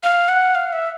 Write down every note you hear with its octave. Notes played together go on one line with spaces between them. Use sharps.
F5
F#5
F5
E5